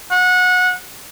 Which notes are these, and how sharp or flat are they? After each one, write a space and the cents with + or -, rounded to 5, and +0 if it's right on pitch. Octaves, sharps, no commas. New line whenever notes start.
F#5 -25